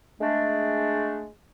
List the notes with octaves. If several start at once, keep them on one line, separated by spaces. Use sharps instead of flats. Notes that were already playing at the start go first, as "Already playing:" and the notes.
G#3 A3 D4